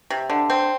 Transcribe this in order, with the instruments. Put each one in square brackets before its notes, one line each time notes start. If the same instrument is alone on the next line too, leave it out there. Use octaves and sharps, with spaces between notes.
[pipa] C3
D3
C4